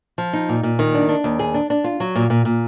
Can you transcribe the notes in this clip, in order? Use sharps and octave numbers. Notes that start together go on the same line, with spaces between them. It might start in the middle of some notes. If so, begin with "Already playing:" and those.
F3
D#4
A#2
A#2
D#3
D4
D4
D#2
G#4
D4
D4
F4
F#3
A#2
A#2
A#2